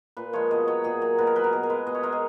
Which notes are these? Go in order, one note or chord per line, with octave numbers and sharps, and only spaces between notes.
A#2 B4
F3 G#3 C#5
B2 D#5
F#3 C#5
A#2 G#4
F#3
B2 B4
A#4
F#3 B4
A#4
B2 G#4
A#4
G#3 B4
B2 D#5
C#5
G#3 A#4
G#4